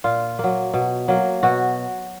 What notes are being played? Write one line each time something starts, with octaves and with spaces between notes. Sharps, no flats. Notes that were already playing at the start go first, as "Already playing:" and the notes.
A#2 F4
F#3 A#3
B2
F#3 A#3
B2 F#4